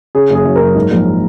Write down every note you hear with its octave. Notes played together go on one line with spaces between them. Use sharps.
C#3 G#4
F#1
G#4
F#2
F#2 A#4
G#2
A#1